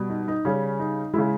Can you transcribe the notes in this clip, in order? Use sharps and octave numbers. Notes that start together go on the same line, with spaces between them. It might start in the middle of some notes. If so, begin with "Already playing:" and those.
Already playing: B2 G3
D#4
D#4
C#3 G3 C#4
D#4
C#3 G#3 E4